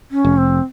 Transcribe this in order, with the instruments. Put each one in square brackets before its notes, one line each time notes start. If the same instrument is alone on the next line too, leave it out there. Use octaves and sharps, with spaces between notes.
[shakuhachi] C#4
[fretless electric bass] F1
[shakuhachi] C4